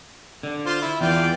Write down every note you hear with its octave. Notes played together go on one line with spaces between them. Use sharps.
D3
F4 C5
E4
E2 E3 F4 D5 G5